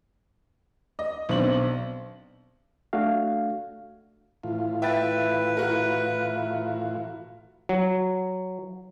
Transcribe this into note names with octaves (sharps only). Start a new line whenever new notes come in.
D#5
B1 B2 C4 D4 C5 F#7
A3 D4 F#4 F5
A2 E3 F4
B4 E5 G5 A6
E4 F#4 A#4
F#3